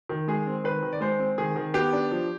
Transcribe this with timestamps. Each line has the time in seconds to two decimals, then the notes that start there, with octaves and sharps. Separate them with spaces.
0.09 D#3
0.28 G#3 G#4
0.47 C4
0.64 D#3 B4
0.83 D#3
0.93 D5
1.00 G#3 C5
1.20 C4
1.38 D#3 G#4
1.56 D#3
1.74 B3 G4
1.93 D4
2.11 F3